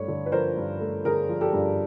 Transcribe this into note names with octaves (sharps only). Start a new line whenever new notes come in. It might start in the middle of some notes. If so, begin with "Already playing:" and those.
Already playing: G2 A3 C#5
D3
B4
F3 A#4 C5
G2
A3
D3 G#4 A#4
F3
G4 A4
G2